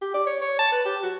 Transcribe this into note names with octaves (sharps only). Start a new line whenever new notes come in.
G4
D5
C#5
C#5
A5
B4
G4
F#4